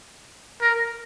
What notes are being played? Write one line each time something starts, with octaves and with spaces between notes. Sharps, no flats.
A#4